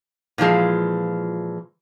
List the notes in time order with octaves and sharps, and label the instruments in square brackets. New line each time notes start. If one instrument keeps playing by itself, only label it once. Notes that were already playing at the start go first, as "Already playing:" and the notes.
[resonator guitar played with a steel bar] A#2 E3 F3 G#3